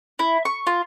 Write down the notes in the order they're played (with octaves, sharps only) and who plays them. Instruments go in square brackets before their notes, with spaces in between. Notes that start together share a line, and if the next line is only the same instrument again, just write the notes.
[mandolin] E4
C#6
F4